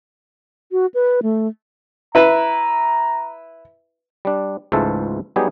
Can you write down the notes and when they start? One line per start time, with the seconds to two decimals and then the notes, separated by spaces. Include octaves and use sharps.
0.72 F#4
0.94 B4
1.23 A3
2.15 E4 B4 A#5
4.25 G3 D4
4.72 C#2 G#2 E3 A3 F4 A4
5.36 F#3 G3 B3 D#4 G4 G#4